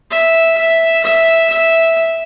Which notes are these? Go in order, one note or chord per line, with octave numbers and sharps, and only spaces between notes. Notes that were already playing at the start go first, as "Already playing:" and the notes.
E5
E5
E5
E5